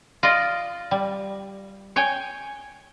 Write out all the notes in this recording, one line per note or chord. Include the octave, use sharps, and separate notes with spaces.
F4 D5 D#5
G3
C#5 G5 G#5